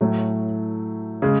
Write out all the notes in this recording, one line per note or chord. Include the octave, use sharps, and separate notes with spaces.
A2 F#3 A3
C#3 G#3